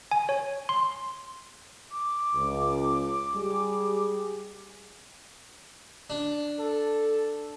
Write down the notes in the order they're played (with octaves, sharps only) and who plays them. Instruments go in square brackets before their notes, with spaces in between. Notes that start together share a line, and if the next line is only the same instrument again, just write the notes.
[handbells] G#5
C#5
C6
[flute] D6
[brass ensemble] C#2
G3 G#4
[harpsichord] D4
[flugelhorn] A4